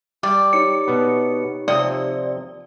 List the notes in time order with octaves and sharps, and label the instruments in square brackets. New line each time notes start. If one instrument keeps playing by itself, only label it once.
[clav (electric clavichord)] G3 [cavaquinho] D5
[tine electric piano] D#4 G4 C#5 [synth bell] C#7
[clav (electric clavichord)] B2 B3
[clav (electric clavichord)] C3 F3 C4 [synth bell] D5 [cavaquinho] D#6